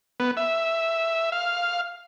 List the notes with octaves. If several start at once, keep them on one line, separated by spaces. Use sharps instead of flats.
B3
E5
F5